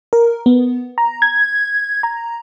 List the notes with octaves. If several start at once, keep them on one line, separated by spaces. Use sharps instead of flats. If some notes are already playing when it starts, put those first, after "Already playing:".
A#4
B3
A#5
G#6
A#5